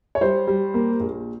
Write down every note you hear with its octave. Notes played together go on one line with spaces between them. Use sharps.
C#5
G3 C5
G3
A#3
A#1